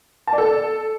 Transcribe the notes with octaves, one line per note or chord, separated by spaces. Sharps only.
A5
D5
A4